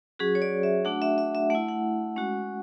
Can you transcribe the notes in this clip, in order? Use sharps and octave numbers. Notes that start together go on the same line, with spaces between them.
F#3 C#4 F#4 G#4
C#5
D5
E5
A3 D4 F#4 F#5
E5
E5
E5
A3 E4 F#5
F#5
G#3 C#4 F#4